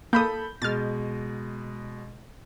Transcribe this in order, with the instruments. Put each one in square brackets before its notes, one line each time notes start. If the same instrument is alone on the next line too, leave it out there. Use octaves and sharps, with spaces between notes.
[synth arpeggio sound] A#3 D#6 [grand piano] A4 B5 G6
[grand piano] B2 G#3 [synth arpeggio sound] F6 A6